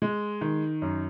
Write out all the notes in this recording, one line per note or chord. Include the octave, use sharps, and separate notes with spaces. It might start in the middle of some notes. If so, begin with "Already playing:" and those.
G#3
D#3
F#2